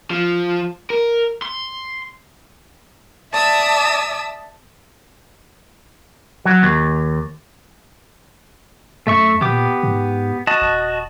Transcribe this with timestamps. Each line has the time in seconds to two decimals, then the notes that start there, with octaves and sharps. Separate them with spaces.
0.11 F3
0.90 A#4
1.42 C6
3.32 D5 E5 A5 D#6 E6
6.45 F#3
6.63 D#2
9.07 F#2 A3 E5 C#6
9.41 A#2 B3 G4 D6
9.83 G#2
10.47 F#4 D#5 A5
10.62 D#1